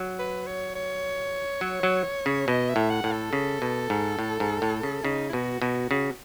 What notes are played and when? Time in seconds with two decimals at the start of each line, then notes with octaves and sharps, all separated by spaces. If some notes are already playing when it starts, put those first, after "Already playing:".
Already playing: F#3
0.19 B4
0.47 C#5
0.75 C#5
1.61 F#3
1.83 F#3
2.26 C#3
2.48 B2 D#5
2.69 E5
2.76 A2
2.90 F#5
3.04 A2
3.12 A4
3.33 C#3
3.62 B2
3.90 G#2
4.19 A2
4.40 G#2
4.62 A2
4.83 C#3
5.04 C#3 D#4
5.29 E4
5.33 B2 F#4
5.62 B2 F#4
5.91 C#3 F#4